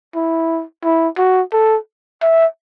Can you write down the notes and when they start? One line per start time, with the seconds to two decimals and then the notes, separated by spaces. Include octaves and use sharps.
0.16 E4
0.84 E4
1.18 F#4
1.53 A4
2.22 E5